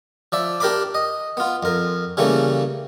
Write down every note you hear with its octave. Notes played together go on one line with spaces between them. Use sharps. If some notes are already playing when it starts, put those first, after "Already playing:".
F3 D5 E5
D4 G4 A#4 D5 B5 D6
D#5
B3 F4
F2 A#4
C#3 E3 G3 A3 A#3 C#4